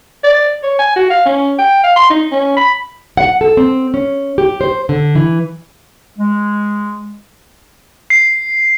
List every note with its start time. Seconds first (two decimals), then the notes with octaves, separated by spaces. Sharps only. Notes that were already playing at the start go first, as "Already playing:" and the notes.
0.24 D5
0.63 C#5
0.79 G#5
0.96 F#4
1.10 F5
1.26 C#4
1.58 G5
1.84 F5
1.96 C6
2.10 D#4
2.32 C#4
2.57 B5
3.17 F#5
3.41 A4
3.57 C4
3.94 C#4
4.38 G4
4.61 C5
4.89 D3
5.15 E3
6.19 G#3
8.10 C7